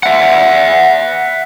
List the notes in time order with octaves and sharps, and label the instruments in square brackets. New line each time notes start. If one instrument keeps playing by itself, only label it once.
[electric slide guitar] E5 F#5